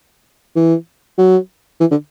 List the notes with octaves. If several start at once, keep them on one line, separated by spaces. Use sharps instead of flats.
E3
F#3
E3
D3